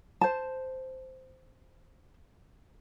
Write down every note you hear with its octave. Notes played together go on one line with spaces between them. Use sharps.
C5 A5